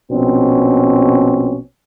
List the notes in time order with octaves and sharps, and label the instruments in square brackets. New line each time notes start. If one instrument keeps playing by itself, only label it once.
[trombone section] A#1 B2 C4 C#4